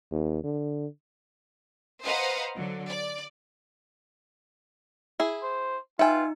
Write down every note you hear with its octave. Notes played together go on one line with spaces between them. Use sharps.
D#2
D3
B4 C5 D#5 F5 F#5 A#5
D3 F#3
D5
E4 G#4
C5
D#4 F4 B4 E5 G5 G#5